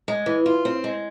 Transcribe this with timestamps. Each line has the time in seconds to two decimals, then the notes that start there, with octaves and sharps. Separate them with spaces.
0.08 G#3
0.26 E3
0.46 F4
0.65 C4
0.84 G#3